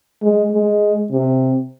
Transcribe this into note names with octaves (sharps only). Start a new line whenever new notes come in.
G#3
G#3
C3